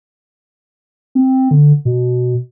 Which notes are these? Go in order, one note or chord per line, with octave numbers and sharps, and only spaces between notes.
C4
D3
B2